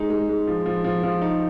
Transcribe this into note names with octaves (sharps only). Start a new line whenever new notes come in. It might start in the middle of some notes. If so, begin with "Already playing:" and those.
Already playing: G#3 D#4
G#3
G#3
F3
F3
F3
F3
D#4